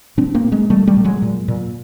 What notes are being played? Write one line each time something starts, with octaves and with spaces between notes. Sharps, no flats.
A#2 C4 D4
A#3 C4
A#2
G#3 A#3
A#2 G3 A3
G3 A3
A#2
F#3 G#3
A#2
A#2